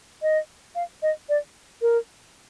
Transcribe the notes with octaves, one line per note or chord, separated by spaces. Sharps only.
D#5
F5
D#5
D5
A#4